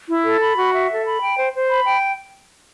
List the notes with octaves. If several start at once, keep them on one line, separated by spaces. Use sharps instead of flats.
E4
A4
B5
F#4
E5
A4
B5
G5
C5
C5
B5
G5